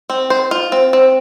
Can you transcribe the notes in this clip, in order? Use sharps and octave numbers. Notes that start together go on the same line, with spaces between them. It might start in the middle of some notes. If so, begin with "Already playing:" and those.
C4
C5
F4
C4
C4